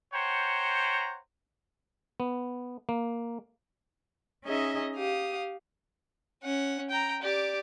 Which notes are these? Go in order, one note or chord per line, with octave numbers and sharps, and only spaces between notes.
C5 C#5 F#5 G5 A#5
B3
A#3
C#4 D#4 G#4 D#5 E5
G4 F5 D#6
C#4 F#5
G5 A#5
G4 D5